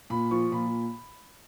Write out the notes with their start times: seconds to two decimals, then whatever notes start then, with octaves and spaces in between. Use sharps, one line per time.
0.10 A#2 B5
0.31 F3 C#6
0.51 A#2 B5